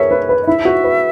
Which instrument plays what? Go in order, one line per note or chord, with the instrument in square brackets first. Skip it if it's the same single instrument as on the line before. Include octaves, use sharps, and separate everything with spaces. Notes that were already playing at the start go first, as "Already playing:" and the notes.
Already playing: [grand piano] G#4 A#4 C#5 [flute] E5
[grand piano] B4
B4
[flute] D#5
[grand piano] E4 [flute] E5
[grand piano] F#4
B4